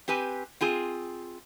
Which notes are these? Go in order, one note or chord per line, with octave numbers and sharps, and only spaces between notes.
C4 G4 B4 G#5
C4 F4 G#4